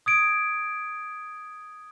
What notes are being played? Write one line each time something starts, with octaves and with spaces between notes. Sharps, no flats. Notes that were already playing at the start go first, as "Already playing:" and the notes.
D#6 G#6 D7